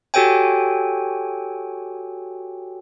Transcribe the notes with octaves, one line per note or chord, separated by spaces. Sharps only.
F#4 G4 A4 C#5 G5 G#5